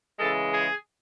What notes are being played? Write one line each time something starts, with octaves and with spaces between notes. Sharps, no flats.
C#3 E3 G#3 A4
G#4